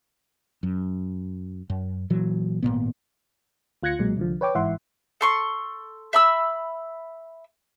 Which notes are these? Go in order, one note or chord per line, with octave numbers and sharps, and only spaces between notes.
F#2
F#2
A#2 E3 F#3
G#1 G2 A#2 B3
D2 F4 F#6 G#6 A#6 C#7
B1 A#2 F#3 G#3
C2 D3 F3
B4 C#5 G5 D6
G1 G#2 E3 E5 F#5 C6
A4 C6 C#6
E5 B5 E6